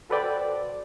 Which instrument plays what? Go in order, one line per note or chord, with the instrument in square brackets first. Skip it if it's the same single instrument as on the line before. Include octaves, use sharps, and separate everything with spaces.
[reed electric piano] F#4 A4 B4 C5 D5 G5